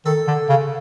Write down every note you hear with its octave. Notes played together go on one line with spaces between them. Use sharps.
D#3 A4
D3
C#3